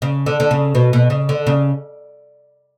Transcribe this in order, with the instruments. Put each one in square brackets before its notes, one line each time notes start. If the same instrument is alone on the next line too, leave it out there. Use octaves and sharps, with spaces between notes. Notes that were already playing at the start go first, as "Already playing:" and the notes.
[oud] C#3
D3
D3
C#3
B2
B2
C#3
D3
C#3